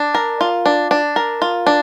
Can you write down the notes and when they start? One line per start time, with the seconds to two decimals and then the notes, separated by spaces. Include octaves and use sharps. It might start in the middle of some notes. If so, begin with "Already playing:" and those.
Already playing: D4
0.15 A#4
0.41 F4
0.66 D4
0.91 D4
1.16 A#4
1.42 F4
1.67 D4